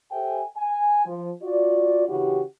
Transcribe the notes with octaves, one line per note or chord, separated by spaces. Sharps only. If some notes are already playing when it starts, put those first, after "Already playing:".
G4 A4 C5 E5 G5 G#5
G#5
F3
F4 F#4 D5
C#3 E3 C#4 E4 F#4 G4